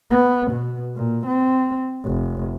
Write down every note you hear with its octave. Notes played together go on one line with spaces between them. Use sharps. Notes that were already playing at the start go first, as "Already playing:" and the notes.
B3
B2
A#2
C4
F1